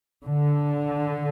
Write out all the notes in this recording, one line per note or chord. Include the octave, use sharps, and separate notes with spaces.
D3